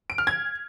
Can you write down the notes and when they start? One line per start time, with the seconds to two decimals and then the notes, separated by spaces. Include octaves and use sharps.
0.10 D7
0.18 F6
0.27 G#6